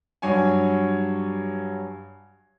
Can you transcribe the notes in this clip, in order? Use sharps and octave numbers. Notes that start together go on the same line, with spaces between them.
G2 F#3 C#5 G#5